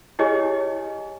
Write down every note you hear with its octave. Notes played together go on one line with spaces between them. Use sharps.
E4 G4 G#4 C#5 D#5 G#5